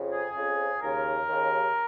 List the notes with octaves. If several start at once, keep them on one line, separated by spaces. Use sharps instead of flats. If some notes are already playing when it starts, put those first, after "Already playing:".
Already playing: F2 C#3
G#4
F2 C#3
D#2 C#3 A#4
D#2 C#3